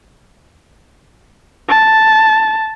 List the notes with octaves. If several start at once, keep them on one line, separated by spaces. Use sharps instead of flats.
A5